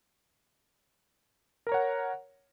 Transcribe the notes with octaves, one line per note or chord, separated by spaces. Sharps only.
A#4 C#5 F#5 A#5